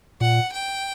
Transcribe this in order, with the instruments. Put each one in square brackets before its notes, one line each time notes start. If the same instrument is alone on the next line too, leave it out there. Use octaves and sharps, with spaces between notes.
[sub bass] A#2 [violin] F#5
[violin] G5